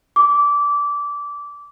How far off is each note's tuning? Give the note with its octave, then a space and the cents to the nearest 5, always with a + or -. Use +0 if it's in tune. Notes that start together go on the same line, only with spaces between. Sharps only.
D6 -20